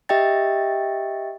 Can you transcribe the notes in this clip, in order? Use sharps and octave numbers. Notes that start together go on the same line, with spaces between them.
G4 D#5 E5 G5 A6